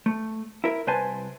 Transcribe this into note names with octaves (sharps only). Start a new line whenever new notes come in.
A3
E4 A#4
C2 B4 C5 G#5 A5